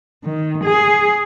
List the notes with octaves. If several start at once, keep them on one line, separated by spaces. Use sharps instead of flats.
D#3
G#4